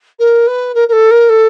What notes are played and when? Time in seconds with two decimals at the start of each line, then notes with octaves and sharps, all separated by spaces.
0.19 A#4
0.47 B4
0.75 A#4
0.88 A#4
0.92 A4
1.11 A#4
1.29 A4